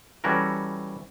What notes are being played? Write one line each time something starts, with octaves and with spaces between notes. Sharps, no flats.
E3 G3 C#4 F#4 A4 A#4